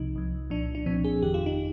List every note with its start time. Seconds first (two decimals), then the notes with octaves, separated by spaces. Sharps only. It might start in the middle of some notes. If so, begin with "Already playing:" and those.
Already playing: C2 C3 F3 D#4
0.15 C2 C3 F3
0.50 C2 A#2 F3 D4
0.75 D4
0.86 C2 A#2 F3 C4
1.04 G#4
1.22 G1 F2 D#3 G4
1.34 F4
1.46 D#4